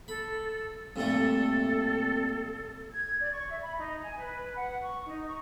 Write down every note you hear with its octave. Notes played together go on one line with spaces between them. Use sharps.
A4 B5
G2 A#2 A3 C4 A4
G#6
D5
C#6
E5
B5
D#4
G#5
B4
F#5
C#6
D#4
C#6